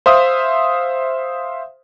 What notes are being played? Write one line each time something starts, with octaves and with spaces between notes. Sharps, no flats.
C5 E5 F5 D#6